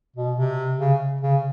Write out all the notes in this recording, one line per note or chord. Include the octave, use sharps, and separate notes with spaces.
B2
C3
C#3
C#3